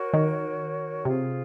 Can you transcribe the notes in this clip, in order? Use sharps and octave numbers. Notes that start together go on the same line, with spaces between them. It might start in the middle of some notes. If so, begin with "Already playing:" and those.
Already playing: F#4 A#4 C#5
D#3
C3 F4 G#4 C5